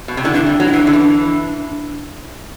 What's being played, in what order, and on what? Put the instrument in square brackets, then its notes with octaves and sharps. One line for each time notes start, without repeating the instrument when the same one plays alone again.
[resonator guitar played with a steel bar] B2
C3
[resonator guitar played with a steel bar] D3 [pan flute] E4
[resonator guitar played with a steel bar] E3 [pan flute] D4
[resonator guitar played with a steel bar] G3
F#3
[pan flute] E4
[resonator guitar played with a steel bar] E3 [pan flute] D4
[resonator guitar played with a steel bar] D3
E3